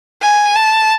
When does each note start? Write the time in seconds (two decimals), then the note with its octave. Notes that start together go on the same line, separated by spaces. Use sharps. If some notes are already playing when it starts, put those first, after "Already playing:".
0.22 G#5
0.55 A5